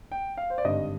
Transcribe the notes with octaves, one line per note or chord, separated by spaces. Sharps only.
G5
F5
C5
D5
G#1 G2 D3 G3 D#5